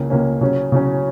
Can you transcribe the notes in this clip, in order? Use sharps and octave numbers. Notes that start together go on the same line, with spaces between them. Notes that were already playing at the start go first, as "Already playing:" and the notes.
Already playing: C#2 C#3 A#3 C#4
C#2 C#3 A#3 C#4
C#3 F#3 C#4
C#3 F#3 C#4